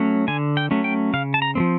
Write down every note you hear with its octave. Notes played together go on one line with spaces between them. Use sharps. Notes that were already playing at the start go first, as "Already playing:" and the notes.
Already playing: F#3 A3 C#4
D3 G#5
G5
F#3 A3 C#4
G5
C#3 F5
A5
A#5
F3 A3 C4